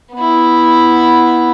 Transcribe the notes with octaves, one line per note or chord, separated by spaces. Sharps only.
B3 E4